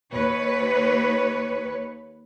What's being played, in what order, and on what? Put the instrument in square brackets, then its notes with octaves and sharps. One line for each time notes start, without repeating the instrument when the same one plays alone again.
[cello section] D#2 B4 C#5